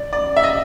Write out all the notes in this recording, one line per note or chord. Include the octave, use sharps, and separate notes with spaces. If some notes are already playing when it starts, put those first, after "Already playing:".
Already playing: D5
D5
E5
D#5